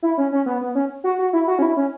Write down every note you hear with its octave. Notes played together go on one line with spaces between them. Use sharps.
E4
C#4
C#4
B3
B3
C#4
F#4
F#4
E4
F#4
C#4
E4
C#4